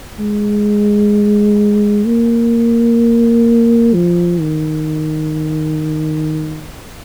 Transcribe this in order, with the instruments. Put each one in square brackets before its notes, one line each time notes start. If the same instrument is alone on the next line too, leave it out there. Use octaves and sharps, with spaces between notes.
[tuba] G#3
A#3
F3
D#3